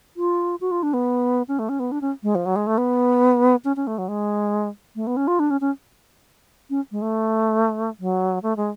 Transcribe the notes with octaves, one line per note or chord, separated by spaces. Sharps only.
F4
F#4
F4
D4
B3
C#4
A3
C#4
B3
D4
C#4
G#3
F3
F#3
G#3
A3
B3
C#4
C#4
A3
F#3
G#3
A3
B3
C#4
F4
D4
C#4
C#4
C#4
G#3
A3
F#3
A3
G#3